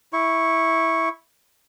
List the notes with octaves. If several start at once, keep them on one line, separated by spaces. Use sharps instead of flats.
E4 C#6